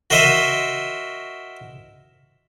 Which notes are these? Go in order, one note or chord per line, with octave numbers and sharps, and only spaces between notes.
F#4 A#4 C5 D#5 E5